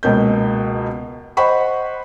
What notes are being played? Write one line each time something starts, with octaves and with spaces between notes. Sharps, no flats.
C#2 B2 A#3 G6
C5 D#5 F#5 B5 C#6